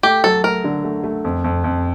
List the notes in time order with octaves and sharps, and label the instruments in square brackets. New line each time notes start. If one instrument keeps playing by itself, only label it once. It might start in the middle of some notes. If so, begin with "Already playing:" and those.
[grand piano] A3 [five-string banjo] G4
[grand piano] F#3 [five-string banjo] A4
[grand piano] A3 [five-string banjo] A#4
[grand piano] D3
A3
A3
F2
F2
F2